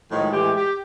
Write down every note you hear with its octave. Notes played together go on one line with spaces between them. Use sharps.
A2 D#3 F3 G#3
A2 E3 G#3 G4
G4